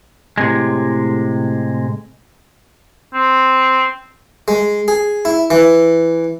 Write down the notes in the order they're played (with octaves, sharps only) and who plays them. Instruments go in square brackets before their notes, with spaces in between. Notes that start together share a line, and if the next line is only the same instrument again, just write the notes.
[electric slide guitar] A2 C3 G#3
[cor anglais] C4
[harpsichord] G#3
G#4
E4
E3